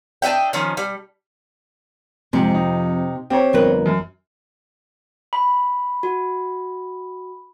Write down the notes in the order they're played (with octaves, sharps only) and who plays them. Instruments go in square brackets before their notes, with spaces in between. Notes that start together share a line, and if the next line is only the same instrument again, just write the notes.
[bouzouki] D4 D#5 E5 G5
D#3 F3 C#4
G3
[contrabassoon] F2 [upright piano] G#2 [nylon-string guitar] C3
[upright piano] D#4
[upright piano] C4 C#5 [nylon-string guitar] G4
[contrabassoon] G1 [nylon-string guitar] F2 A#4 B4
[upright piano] F#2
[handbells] B5
[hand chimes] F#4